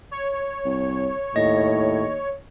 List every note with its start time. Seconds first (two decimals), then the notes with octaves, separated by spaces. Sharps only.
0.11 C#5
0.65 C2
1.36 D#2 A2 D#5 A#6